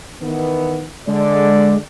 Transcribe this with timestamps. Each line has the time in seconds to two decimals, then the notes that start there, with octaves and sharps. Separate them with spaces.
0.22 D#3 E3 B3
1.07 D3 G#3 D5